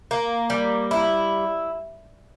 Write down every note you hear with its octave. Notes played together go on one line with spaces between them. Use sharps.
A#3
G3
E4